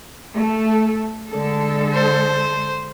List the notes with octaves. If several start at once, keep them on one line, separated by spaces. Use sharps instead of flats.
A3 A4
D3 G#3 A4
C5